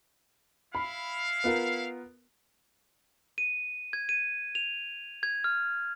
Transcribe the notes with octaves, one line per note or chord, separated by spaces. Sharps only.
E4 F5 B5
B3 F4 A#4
D#7
G#6
D#7
F7
G#6
F6